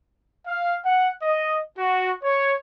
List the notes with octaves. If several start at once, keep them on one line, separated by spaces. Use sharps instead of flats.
F5
F#5
D#5
F#4
C#5